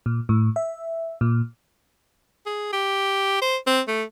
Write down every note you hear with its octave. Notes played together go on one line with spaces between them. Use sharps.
A#2
A2
E5
A#2
G#4
G4
C5
C4
A3